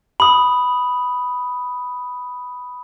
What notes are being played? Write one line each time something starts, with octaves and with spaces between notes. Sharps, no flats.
B5 D#6